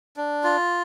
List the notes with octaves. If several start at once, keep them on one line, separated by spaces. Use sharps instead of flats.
D4
F4